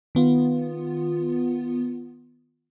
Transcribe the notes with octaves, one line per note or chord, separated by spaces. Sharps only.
D#3 B3 F4